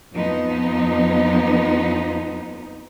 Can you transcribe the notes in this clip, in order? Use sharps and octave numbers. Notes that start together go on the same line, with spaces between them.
F2 F3 B3 D#4